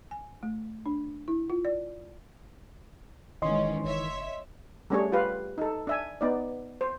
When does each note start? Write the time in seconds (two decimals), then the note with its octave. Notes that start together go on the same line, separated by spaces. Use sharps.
0.11 G#5
0.43 A3
0.86 D4
1.28 E4
1.50 F4
1.65 D5
3.42 E1 G#2 D#3 E3 C#4 D#5 C6
3.85 F#1 C#5 E5
4.90 G3 A3 C#4 D4 G#4 C#5
5.12 F4 G4 B4 F5
5.58 D#4 A4
5.87 D4 E5 G#5
6.21 B3 D#4 D5
6.81 C5